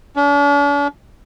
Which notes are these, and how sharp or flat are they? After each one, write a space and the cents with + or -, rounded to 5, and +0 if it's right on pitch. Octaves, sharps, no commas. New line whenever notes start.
D4 -45